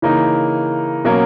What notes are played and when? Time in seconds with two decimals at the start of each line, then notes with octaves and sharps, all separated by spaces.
0.02 C#3 E3 A#3 D#4
1.04 B2 F#3 A#3 C#4